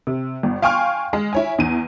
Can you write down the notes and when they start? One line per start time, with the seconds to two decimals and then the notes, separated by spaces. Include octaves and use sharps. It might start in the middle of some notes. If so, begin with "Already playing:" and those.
0.07 C3
0.43 G1
0.62 F5 G5 G#5 C6 C#6 F6
1.13 G#3
1.33 E4 C#5 G#5
1.58 E2 D#7